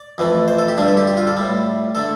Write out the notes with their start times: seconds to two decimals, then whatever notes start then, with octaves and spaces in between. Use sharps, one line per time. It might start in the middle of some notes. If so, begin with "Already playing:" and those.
Already playing: D5
0.18 F2 E3 A3
0.48 C5
0.58 A4
0.68 G4
0.77 G2 D3 G3 D4
0.88 A4
0.97 G4
1.07 G4
1.17 F4
1.27 A4
1.37 A2 G3
1.95 D3 A3 A4